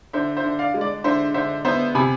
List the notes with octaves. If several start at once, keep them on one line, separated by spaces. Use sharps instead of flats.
D3 C5 E5
C5 E5
D3
D5 F5
G#3
D5
D3 C5 E5
D3 C5 E5
B3 C5 E5
C3 G#5 B5